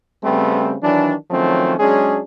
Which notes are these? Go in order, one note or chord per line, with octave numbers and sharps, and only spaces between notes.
C#3 G3 A3 B3 C4
D#3 E3 F#3 D4
D#3 F3 F#3 A3 C4 C#4
F#3 G#3 C#4 D4 G#4